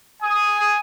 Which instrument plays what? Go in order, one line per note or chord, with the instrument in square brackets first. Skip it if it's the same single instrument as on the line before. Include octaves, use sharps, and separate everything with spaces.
[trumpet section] G#5 D#6